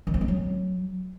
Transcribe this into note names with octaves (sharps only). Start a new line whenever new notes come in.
D#3
C4
G#3
F#3